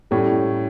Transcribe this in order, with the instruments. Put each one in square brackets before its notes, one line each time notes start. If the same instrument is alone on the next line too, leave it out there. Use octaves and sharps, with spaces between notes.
[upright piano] A2 G3 C#4